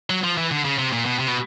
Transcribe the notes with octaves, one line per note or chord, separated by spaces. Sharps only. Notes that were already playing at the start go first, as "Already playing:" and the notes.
F#3
F3
E3
D3
C#3
C3
A#2
B2
C3
B2